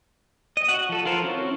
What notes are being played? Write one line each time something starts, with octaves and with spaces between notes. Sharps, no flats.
D#5
F#4 F#5
F3 A4
F4 A4 A#4 C5
C4 C#4 E4 F#4